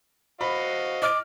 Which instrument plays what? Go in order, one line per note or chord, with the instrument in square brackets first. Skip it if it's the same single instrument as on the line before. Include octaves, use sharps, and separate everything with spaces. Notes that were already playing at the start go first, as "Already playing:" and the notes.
[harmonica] F#4 D#5 F5 [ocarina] C5 [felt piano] B5
[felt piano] D#5 F6 [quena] D6